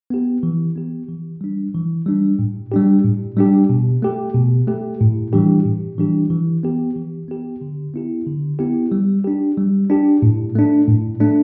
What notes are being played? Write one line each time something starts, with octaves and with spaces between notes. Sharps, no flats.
B3 G4
E3
B3 G4
E3
G3 D4
E3
G3 D4
A2
G3 D4 G4
A2
G3 D4 G4
B2
A3 G4
B2
A3 G4
A2
E3 G3 D4 G4
A2
E3 G3 D4 G4
E3
B3 G4
E3
B3 G4
D3
B3 E4 G4
D3
B3 E4 G4
G3
D4 G4
G3
D4 G4
A2
A3 D4
A2
A3 D4